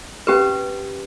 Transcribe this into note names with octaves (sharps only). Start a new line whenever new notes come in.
C#4 G4 B4